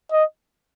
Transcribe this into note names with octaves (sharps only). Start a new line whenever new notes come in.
D#5